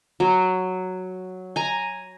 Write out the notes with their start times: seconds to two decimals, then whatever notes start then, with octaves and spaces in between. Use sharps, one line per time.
0.20 F#3
1.56 G#5 A#5